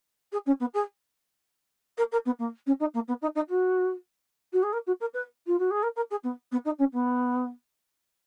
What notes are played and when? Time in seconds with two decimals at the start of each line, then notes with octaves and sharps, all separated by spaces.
0.32 G#4
0.46 C#4
0.60 B3
0.74 G#4
1.97 A#4
2.12 A#4
2.25 B3
2.39 A#3
2.66 C#4
2.80 D#4
2.94 A#3
3.08 B3
3.22 D#4
3.35 D#4
3.49 F#4
4.53 F#4
4.63 G#4
4.72 A#4
4.87 F#4
5.00 A#4
5.13 B4
5.47 F4
5.59 F#4
5.70 G#4
5.83 A#4
5.96 A#4
6.10 G#4
6.23 B3
6.51 B3
6.65 D#4
6.78 C#4
6.93 B3